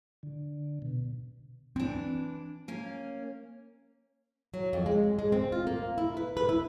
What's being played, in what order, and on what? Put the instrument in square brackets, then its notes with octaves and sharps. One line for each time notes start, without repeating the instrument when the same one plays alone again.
[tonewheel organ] D3
B2
[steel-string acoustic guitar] E3 D4 [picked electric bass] C4
[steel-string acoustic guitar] A#3 C#4
[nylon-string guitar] F#3
F2
G#3
G#3
C4
F4
A#3
E4
B4
B4
E4